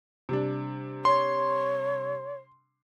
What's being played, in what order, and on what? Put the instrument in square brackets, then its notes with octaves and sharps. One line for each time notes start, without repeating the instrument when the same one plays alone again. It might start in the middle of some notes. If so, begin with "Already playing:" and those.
[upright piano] C3 G3 D4
[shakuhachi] C#5 [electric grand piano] C6